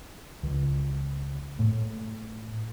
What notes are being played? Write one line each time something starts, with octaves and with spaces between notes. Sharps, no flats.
C#2
A2